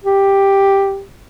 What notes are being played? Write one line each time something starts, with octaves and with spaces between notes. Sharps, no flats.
G4